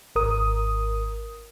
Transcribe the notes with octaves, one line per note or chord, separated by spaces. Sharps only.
G#1 A#4 D#6